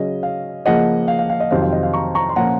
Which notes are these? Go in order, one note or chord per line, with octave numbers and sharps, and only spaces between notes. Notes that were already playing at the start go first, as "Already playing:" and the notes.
Already playing: C#3 F#3 C#4 D#5
F5
C#3 F3 A#3 D#5 F#5
F5
F5
F5
D#5
F2 C3 D#3 F#3 C4 F5
F5
D#5
F5
A#5 C#6
A#5 C#6
C6
A#2 F3 A#3 C#4 F#5 A#5